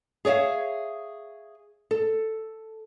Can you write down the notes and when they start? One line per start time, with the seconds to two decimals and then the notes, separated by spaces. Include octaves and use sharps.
0.25 G#4 C#5 D5 E5 F5
1.91 A4